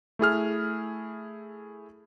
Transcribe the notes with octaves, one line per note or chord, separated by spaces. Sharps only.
A3 E4 G#4 F6